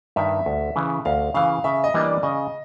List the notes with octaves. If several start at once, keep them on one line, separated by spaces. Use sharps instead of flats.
G2 D#3 E5
D2
C#3 E3
D2 F5
C#3 E3 F5
C#3 E5
D#5
E3 G3 A#3 D4
D5
C#3 D#5